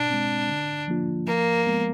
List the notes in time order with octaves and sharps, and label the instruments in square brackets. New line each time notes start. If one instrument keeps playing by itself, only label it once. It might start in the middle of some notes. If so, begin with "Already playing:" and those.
Already playing: [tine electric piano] B2 [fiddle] D4
[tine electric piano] G#3 C4
D3
F3 A#3 D4 F4
[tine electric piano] F3 [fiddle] A#3
[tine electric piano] G#3 B3